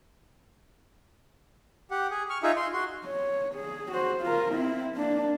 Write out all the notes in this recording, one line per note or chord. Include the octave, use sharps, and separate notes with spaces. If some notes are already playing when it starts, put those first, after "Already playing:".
G4 F#5
G#4
C#6 F6
D#4 F4 G#4 E5
C6
F#4 C6
C#5
G#4
F#4 C5
F4 A#4
C4 E4
A#3 D4